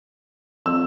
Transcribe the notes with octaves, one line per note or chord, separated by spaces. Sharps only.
F2 E6